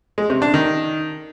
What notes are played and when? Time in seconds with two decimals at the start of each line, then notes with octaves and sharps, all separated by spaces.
0.18 G#3
0.30 C3
0.42 D4
0.54 D#3